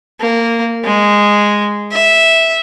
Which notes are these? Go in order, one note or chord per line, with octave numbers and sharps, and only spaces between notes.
A#3
G#3
E5